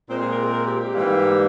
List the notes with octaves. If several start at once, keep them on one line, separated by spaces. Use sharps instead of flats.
A#2 G#3 C4 C5
G#4
A#4
A#4
G4
G4
G#2 E3 G3 A#3